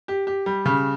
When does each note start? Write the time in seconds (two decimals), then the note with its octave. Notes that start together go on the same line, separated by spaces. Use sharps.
0.08 G4
0.27 G4
0.46 G3
0.66 C#3